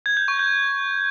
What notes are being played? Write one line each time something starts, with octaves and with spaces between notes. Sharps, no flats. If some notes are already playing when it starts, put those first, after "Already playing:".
G#6
G6
C#6
G6